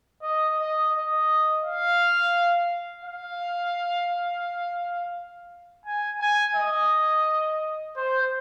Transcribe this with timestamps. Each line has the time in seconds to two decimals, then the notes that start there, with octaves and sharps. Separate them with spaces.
0.23 D#5
0.58 D#5
0.93 D#5
1.64 F5
3.04 F5
5.85 G#5
6.21 G#5
6.56 D#5
7.96 C5